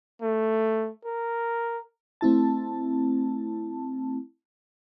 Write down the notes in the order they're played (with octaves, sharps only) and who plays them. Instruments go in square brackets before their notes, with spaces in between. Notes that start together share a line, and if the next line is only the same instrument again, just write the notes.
[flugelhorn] A3
A#4
[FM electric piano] A3 C4 E4 A5